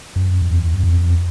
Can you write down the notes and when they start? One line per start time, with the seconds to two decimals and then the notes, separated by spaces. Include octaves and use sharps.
0.16 F#2
0.42 F2
0.49 E2
0.74 F#2
0.83 F2